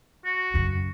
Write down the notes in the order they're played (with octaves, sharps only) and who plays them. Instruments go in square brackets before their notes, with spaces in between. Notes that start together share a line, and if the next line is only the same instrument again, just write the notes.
[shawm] F#4
[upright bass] F#2 C#3